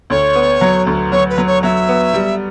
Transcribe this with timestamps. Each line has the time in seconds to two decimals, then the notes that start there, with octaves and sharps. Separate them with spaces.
0.10 D2 C#5
0.35 B3
0.61 F#3
0.87 D2
1.12 F#3 C#5
1.30 B4
1.38 F#3
1.47 C#5
1.63 F#3 E5
1.89 B3
2.14 G3